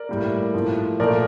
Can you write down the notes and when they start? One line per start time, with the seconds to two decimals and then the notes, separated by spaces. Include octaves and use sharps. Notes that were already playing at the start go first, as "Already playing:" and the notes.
Already playing: A#4 D5
0.09 A2 G3 A#3
0.54 A2 F3 A#3
1.00 A#2 F3 A3 A#4 D5